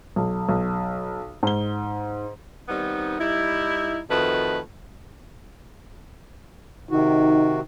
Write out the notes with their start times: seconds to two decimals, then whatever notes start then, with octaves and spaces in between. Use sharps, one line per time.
0.16 B1
0.49 B1
1.43 G#2 G7
2.68 D#3 G3 B3 C4 D#4
3.19 G3 D#4 E4
4.10 F2 D#3 A3 F#4 B4
6.91 C3 D#3 D#4 F#4